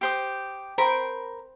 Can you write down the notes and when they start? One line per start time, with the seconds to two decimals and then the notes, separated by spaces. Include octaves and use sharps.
0.01 G4 C5 D#6
0.78 A#4 C5 G5 B5